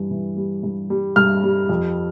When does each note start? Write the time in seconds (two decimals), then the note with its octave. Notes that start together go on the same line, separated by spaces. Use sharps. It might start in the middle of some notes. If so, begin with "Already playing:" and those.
Already playing: G2 E3
0.11 E3
0.36 G3
0.63 G2
0.90 G3
1.16 G2 F6
1.44 G3
1.69 F2